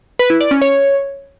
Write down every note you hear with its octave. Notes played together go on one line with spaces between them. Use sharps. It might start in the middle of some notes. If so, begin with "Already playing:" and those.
B4
E4
D5
C#4
C#5